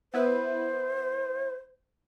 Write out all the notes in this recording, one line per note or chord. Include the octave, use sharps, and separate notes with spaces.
B3 E4 B4 C5